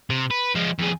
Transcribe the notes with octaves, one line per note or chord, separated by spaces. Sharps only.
C3
B4
F3 G#3
F2 G#4